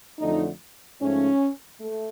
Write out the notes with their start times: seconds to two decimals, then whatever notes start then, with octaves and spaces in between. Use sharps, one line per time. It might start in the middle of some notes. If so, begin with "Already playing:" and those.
0.19 F2 D3 F#3 A3 D#4
1.01 G#2 F3 A3 C#4
1.81 A3